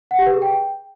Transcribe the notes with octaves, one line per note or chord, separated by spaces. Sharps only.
F#5
G4
B4
G#4
G5